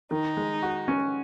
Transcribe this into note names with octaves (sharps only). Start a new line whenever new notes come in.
D#3 D#4
G#3
F#4
C#4